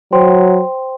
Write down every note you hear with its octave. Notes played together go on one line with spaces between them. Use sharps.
F#3 C5 G5 C6